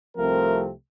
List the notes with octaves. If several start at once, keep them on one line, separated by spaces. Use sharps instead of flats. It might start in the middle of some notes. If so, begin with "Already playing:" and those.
C2 C3 F3 A3 C4 A#4